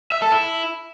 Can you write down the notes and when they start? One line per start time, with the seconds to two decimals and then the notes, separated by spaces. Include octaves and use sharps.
0.12 E5
0.22 A4
0.32 E4